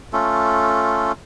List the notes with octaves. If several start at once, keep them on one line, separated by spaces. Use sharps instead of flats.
A3 C#4 F4 A4